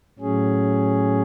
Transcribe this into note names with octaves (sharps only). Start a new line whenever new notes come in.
A2 F#3 C#4 G#4